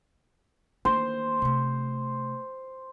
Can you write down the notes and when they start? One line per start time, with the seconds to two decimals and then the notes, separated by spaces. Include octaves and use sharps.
0.85 D#3 A#3 C5
1.42 C3 A3